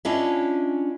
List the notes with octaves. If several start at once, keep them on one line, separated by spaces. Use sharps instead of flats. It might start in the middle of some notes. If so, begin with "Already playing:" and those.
C#4 D4 E4 F4 D#5 E5